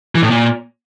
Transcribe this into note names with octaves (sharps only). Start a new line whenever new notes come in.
E3
A2
A#2